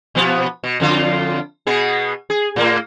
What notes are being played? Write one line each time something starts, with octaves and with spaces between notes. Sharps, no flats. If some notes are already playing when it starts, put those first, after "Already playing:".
B2 F3 B3
B2
F2 D3 F4
B2 B3 G#4
G#4
A2 A#3